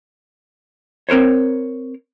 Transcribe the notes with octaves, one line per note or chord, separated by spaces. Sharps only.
C4 A#4 C5 C#5